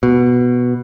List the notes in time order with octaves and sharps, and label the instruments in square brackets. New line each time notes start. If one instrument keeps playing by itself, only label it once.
[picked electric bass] B2